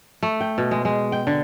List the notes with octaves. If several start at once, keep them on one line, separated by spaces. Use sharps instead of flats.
A3
G5
B2
G#3
G#3
G5
D3